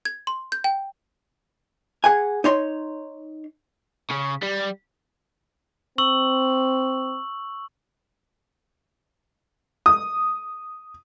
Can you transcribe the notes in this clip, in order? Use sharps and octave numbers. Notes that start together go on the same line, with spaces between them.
G#6
C6
G6
G5
G#4 F#5 G#5
D#4 C#5 C6
C#3
G3
C4 C#6 E6 F#7
D#6